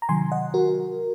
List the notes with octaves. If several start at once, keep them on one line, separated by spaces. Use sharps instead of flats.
A#5
C3 D#3 F#3 G#5 C6
D#5 F#5
F#4 A#4